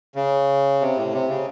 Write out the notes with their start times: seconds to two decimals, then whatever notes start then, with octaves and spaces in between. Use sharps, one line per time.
0.15 C#3
0.81 C3
0.96 A2
1.13 C3
1.29 C#3